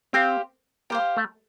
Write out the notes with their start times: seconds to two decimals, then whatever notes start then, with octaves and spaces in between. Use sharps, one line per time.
0.13 C4 G4 C5 F5
0.90 A#3 G4 C5 F5
1.17 A3